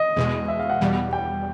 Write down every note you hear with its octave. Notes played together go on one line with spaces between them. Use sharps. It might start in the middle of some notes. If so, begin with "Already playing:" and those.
Already playing: D#5
E2 B2 G#3
E5
F5
F#5
E2 B2 G3
G5